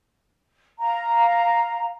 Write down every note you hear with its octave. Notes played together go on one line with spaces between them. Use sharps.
F5 A#5